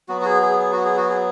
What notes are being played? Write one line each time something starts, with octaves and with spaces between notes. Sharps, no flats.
F#3 B3 F#4
F#4
G#4
G#4
G#4
F#4
G#4
F#4
G#4